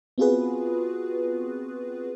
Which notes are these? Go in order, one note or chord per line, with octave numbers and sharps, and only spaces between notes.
B3 C4 F4 F#4 G#4 B4